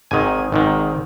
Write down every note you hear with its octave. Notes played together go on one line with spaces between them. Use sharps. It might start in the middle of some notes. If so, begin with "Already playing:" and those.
G#1 G#2 D#3 G#5
G#1 G#2 D#3